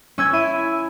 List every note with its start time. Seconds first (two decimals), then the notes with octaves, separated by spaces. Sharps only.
0.18 C#4 E6 G#6
0.34 E4 D#7